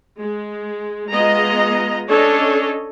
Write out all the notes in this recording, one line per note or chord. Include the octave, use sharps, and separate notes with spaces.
G#3
G#3 B3 F4 D#5 A#5
C#4 D4 A4 C#5 D#5